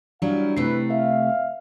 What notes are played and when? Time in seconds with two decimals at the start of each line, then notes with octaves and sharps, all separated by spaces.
0.22 F#3 G3 D4 E4 F5
0.57 C3 A3 E4 B4 C7
0.90 B4 E5 F5